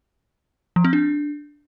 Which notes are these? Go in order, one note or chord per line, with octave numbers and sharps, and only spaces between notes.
F3
C4
D4